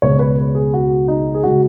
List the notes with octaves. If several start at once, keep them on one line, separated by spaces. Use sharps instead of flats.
C#2 B2 G#3 C#5
B4
G#4
F#4
D#4
G#4
C#3 G#3 F#4